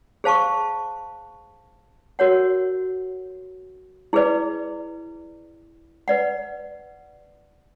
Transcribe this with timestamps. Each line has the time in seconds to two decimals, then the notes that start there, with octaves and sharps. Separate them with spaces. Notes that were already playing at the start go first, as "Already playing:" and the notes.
0.24 G#4 C5 F5 A5 C#6
2.19 F#4 A#4 C#5 F#5
4.13 E4 G#4 B4 D5
6.08 B4 D5 F#5